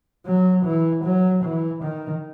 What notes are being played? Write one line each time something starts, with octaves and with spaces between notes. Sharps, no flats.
F#3
E3
F#3
E3
D#3